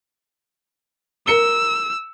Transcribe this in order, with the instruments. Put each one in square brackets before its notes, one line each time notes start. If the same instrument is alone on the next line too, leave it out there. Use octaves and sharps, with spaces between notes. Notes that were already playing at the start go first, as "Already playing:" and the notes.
[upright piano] A#4 C#7 G7 [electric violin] E6